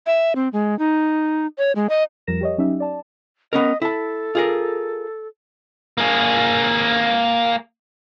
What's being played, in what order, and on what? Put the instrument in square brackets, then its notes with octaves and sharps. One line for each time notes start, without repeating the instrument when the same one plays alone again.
[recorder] E5
C4
G#3
D#4
C#5
G#3
D#5
[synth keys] F2 F3 G3 A#4 A#6 E7
G4 C#5 D#5
F#3 C#4 D#4 G4 E5
D5 A5
[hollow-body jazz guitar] B3 C#4 A#4 [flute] D#5
[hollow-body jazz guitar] E4 A5 [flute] A4
[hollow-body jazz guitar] F4 G#4 A#4
[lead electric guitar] A#3 G#4